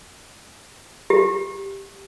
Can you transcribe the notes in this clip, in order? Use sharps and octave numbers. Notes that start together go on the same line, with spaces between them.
G4